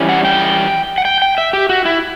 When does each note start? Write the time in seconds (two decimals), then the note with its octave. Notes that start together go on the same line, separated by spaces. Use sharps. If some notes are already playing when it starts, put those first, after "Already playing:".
Already playing: F#2 E3 G3 C#4
0.09 F#5
0.25 G5
0.98 F#5
1.05 G5
1.22 G5
1.38 E5
1.53 G4
1.69 F#4
1.85 E4